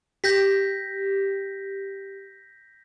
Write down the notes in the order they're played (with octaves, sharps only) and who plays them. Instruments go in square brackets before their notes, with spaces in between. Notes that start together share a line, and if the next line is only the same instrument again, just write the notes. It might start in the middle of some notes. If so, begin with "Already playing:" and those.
[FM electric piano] G4 [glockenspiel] G6 A#6 B6